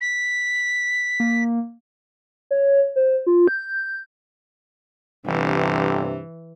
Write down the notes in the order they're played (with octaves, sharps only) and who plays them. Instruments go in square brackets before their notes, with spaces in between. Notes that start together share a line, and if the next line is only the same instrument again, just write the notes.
[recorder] B6
[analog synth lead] A#3
[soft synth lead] C#5
C5
F4
G6
[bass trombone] G1 [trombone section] G2 C3 [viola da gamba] E3